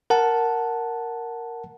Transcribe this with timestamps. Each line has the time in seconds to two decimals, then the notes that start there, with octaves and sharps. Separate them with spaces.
0.10 A#4 F#5 A5